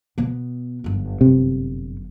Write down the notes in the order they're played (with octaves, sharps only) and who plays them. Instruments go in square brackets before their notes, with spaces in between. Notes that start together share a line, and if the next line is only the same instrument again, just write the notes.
[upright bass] B2 B3
G1 F#2
[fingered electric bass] C3